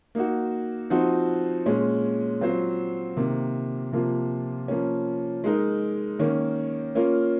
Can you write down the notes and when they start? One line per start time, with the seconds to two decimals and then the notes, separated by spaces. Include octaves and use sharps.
0.15 A#3 D#4 F#4
0.90 F3 C4 D#4 F#4
1.66 A#2 G#3 C#4
2.41 F#3 C4 F4 C5
3.17 C3 D#3 A#3
3.92 C3 F3 A#3 F4
4.68 F3 A#3 C#4
5.44 G#3 D#4 A#4
6.19 D#3 A#3 C#4
6.95 A#3 C#4 F4 A#4